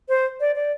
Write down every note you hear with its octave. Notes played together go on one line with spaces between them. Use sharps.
C5
D5
D5